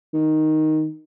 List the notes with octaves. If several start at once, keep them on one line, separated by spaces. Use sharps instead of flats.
D#3